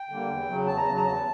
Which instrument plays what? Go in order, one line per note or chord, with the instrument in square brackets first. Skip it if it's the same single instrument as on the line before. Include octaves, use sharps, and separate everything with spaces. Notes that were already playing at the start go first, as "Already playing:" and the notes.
Already playing: [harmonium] G5
D3 G3 A#3
E2
C#3 F#3
E2 A5
A#5
C#3 F#3 A5
A#5
E2 A5